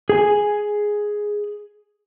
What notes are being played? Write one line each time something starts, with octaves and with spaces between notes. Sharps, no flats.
G#4 G#5